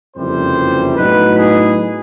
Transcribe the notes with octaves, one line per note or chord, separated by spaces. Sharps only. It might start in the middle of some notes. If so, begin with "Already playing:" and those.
F#1 F2 C3 E3 G3 C5
A2 F#3 B3 D#4 B4
G#4